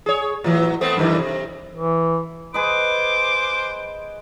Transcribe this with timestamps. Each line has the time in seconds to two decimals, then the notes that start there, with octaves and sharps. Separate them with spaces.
0.06 G#4 C#5
0.44 A2 E3 F#3
0.81 A3 B3 C4
0.97 F#2 D#3 E3
1.18 C3
1.75 E3
2.54 G#4 B4 C5 D#5 D6